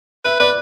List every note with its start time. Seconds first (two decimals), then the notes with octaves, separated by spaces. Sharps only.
0.25 B4 E5
0.40 B4 D5